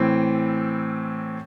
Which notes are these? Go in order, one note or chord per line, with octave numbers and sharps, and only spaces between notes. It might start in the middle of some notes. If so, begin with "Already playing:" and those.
Already playing: A2 E3 C4